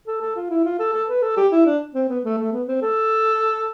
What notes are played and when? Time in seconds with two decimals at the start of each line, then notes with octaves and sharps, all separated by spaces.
0.07 A4
0.21 A4
0.36 F4
0.50 E4
0.65 F4
0.79 A4
0.94 A4
1.09 B4
1.22 A4
1.37 G4
1.52 E4
1.66 D4
1.95 C4
2.09 B3
2.25 A3
2.39 A3
2.53 B3
2.68 C4
2.82 A4